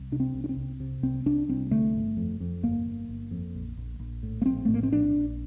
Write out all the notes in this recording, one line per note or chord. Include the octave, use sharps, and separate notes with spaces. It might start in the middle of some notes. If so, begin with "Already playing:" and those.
Already playing: C2
C3 D4
C4
C2
D4
C4
C2
C3
C2 C4
C2 D4
C2 C4
D3 A3
G1
F2
F2
G1 A#3
G1
G1
F2
A#1
A#1
A#1
A2
A#3
A#1 C4
A2 A3
A#3
C4
A#1 D4
A#1